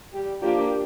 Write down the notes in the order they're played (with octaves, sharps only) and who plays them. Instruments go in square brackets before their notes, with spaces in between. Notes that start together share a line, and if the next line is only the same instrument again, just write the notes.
[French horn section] G3 G4
[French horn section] F3 F4 [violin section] A#3 D4 G4